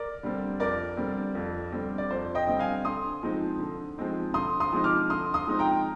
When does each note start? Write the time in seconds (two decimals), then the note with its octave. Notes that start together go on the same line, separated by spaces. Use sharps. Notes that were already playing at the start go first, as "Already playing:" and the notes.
Already playing: A#4 D5
0.23 D3 G3 C4
0.60 F2 A#4 D5
0.97 D3 G3 C4
1.35 F2
1.72 D3 G3 C4
1.98 D5
2.11 F2 C5
2.35 D#5 G5
2.47 D3 G3 C4
2.59 F5 G#5
2.85 D3 C6 D#6
3.23 F3 G#3 C4 D#4
3.59 D3
3.98 F3 G#3 C4 D#4
4.34 D3 C6 D#6
4.60 C6 D#6
4.73 F3 G#3 C4 D#4
4.84 D6 F6
5.09 D3 C6 D#6
5.34 C6 D#6
5.47 F3 G#3 C4 D#4
5.59 G5 A#5